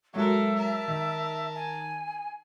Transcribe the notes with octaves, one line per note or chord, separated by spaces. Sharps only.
F#3 G#3 F#4 A4 A#4 E5
A#4 A5
D#3
G#5